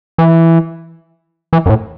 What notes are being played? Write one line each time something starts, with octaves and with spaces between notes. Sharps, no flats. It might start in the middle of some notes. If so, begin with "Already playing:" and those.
E3
E3
F#2
A2